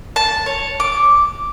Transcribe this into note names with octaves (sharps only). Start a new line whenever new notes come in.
A5
C#5
D6